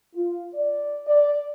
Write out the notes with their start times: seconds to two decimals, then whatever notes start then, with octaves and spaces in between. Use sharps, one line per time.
0.14 F4
0.53 D5
1.07 D5